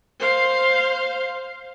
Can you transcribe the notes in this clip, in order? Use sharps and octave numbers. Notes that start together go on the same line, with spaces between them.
C5 F5